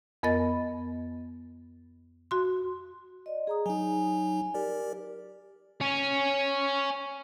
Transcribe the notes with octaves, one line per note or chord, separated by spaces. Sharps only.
F2 B3 A#4 D#5 A6
F#4 C6
D5 D#5
G#4 A#5 D#6
F#3 D#4 G#5
G4 A#4 D5
C#5 G#5